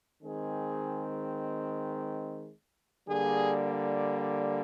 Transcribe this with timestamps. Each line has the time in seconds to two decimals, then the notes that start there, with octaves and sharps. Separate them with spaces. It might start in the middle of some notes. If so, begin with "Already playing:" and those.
0.22 D#3 G#3 C4 G#4
3.08 D3 G3 A#3 G#4